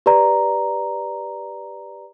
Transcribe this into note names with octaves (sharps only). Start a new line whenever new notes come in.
G4 B4 D5 A#5